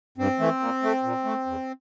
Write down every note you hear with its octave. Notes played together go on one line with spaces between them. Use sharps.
G2 C4
E3 A3
A#2
A3
A#2
A3
E2